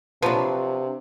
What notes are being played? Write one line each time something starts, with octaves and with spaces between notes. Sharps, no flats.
C3 F3 F#3 D4 B4